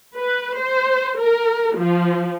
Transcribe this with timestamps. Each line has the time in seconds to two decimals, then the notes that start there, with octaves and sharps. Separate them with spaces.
0.18 B4
0.58 C5
1.19 A#4
1.77 F3